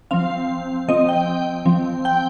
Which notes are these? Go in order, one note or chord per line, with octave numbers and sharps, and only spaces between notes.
F3 C4 F5
F3 C4 D#5
G5
F3 C4
G5